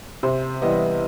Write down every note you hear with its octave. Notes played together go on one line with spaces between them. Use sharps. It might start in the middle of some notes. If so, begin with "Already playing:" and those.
C3 C5
E3 G3 B3 D#5